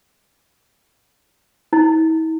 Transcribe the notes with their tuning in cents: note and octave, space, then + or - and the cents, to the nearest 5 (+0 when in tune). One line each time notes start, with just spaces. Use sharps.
E4 -45